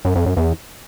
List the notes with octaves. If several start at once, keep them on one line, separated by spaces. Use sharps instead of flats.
F#2
F2
F#2
E2